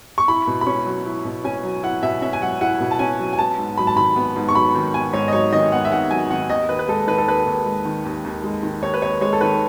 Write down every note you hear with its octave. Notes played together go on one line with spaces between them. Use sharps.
C#6
E4 B5
B2
B5
C#4 C#6
F#3
E4
B2
C#4 G#5
F#3
E4 F#5
B2 E5
C#4 E5
G#5
F#3 F#5
E4 F#5
B2
A5
C#4 G#5
F#3
G#5
B3 A5
G#2
F#3 B5
A5
D#3 B5
B3
G#2
C#6
F#3 B5
D#3
B3 G#5
G#2 C#5
D#5
F#3 C#5
D#3 D#5
B3 F#5
E5
G#2 F#5
F#3 G#5
D#3 F#5
D#2 D#5
D#2 B4
B4
G#3 A4
D#3 B4
A4
D#2 B4
D#2
G#3
D#3
D#2
D#2
G#3
D#3
D#2 C#5
B4
D#2 C#5
G#3 C#5
A4
D#3 B4